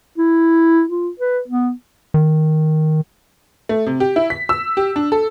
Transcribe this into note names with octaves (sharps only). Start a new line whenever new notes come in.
E4
F4
B4
B3
D#3
A3
C3
G4
E4
B6
E6
G4
D4
A4